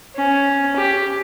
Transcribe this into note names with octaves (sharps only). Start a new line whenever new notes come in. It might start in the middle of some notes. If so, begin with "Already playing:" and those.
C#4
G4